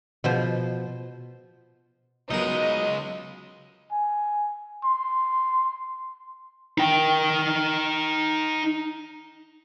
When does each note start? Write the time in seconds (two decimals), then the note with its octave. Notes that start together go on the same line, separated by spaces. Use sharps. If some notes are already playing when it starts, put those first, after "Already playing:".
0.24 B2 F3 C5
2.30 C#2 F#3 G#3 B3 D#4 A#4 D#5
3.92 G#5
4.84 C6
6.78 D#4 G5